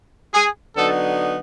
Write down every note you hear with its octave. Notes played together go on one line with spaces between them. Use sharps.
G#4
D3 F#3 B3 D#4 A4